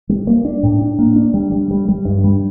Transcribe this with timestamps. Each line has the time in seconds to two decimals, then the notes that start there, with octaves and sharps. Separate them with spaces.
0.09 G3
0.27 A#3
0.45 D4
0.63 A2
0.81 D4
0.99 A#3
1.16 D4
1.34 G3
1.52 G3
1.71 G3
1.89 G3
2.05 G2
2.24 G3